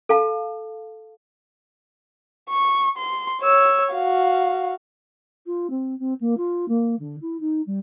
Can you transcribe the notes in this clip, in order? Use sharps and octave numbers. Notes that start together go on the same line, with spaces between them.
A4 F5 A5
C#6
C6
C#5 E6
F#4 F5
F4
C4
C4
A#3
F4
A#3
D3
E4
D#4
G3